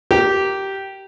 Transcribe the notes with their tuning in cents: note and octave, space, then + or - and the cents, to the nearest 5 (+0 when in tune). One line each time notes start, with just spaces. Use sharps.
G4 -15 A#4 +0